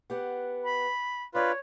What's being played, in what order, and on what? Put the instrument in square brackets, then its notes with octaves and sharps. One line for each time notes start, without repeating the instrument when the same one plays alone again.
[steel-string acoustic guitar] B3 G4 F#5
[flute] B5
[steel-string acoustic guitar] D4 D5 [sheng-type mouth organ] F4 B4 [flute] C#5